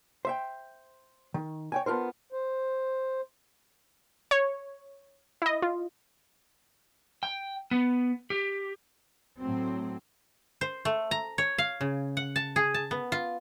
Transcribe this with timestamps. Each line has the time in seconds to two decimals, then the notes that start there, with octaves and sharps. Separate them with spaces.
0.25 C5 E5 G5
1.34 D#3
1.72 C#5 G5 G#5
1.86 B3 D4 F4 A#4 C5
2.32 C5
4.31 C#5
5.42 E4 D#5
5.62 F4
7.23 G5
7.71 B3
8.30 G4
9.39 A2 F#3 C4
10.61 C5
10.85 A3
11.11 A#5
11.38 C#5
11.58 F5
11.81 C#3
12.17 F#5
12.36 A5
12.56 G#4
12.74 A5
12.91 B3
13.12 F4